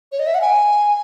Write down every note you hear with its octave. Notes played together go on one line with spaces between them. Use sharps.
C#5
D#5
E5
F#5
G#5